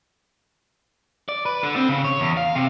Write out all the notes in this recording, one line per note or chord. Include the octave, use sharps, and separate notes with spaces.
D5
B4
D3
C4
C#3
C#5
E2
F5
C3